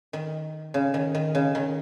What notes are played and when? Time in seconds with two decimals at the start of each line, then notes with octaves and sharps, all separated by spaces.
0.13 D#3
0.74 C#3
0.94 D#3
1.15 D#3
1.35 C#3
1.55 D#3